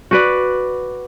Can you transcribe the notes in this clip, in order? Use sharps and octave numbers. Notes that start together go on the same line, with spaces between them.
F#4 B4 D5